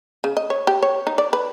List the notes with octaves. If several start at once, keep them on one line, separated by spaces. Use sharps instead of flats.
C#3
D#5
C#5
G4
C#5
D#4
D5
B4